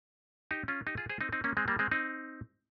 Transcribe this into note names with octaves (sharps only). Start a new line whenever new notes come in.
D#4 G4
C#4 F4
D#4 G4
F4 G#4
G#4 C5
C4 D#4
C4 D#4
A#3 C#4
G#3 C4
G3 A#3
G#3 C4
C4 D#4